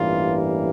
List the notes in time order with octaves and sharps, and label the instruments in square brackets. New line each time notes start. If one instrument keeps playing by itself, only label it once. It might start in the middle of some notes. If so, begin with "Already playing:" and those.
Already playing: [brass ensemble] A1 G2 E3 G3 A#3 F4